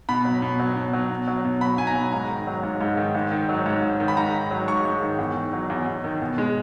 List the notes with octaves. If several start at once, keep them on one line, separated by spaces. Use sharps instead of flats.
B2 B5
F#3
B2
F#3
B2
F#3
B2
F#3
B2
F#3 B5
B2 G#5
A#5
F#3
G#2 A#5
D#3
F#3
G#2
G#2
D#3
G#2
D#3
F#3
G#2
G#2
D#3
B5
G#2 A#5
D#3
F#3
G#2 C#6
G#2
D#3
E2
D#3
F#3
E2
E2
D#3
B2
G#3